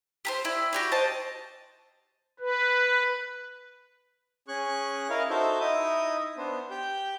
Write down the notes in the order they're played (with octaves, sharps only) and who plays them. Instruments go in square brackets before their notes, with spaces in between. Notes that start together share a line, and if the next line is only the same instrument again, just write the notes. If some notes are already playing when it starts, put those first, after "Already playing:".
[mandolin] G4 A4 C5
E4 D5
F#4 G4 D5
C5 D#5 A5
[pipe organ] B4
[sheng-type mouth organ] C#4 G#4 C#6 F#6
E4 A#4 D#5 F5
D#4 F#4 A4 C5 E5 G6
D#4 E4 D#5 E5 D#6
B3 D4 C5
G4 G5 G6